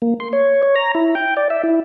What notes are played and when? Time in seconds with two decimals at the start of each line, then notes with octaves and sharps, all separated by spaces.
0.02 A#3
0.20 C6
0.33 C#5
0.63 C#5
0.76 A#5
0.95 E4
1.15 G5
1.37 D5
1.50 E5
1.63 E4